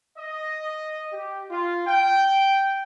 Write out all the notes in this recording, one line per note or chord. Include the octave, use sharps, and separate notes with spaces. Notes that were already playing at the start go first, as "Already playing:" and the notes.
D#5
G4
F4
G5